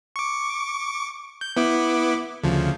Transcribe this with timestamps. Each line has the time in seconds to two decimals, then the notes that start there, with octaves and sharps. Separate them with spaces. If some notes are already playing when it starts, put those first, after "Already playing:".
0.16 C#6 D6
1.41 G6
1.57 B3 E4 D6
2.43 D2 C#3 F3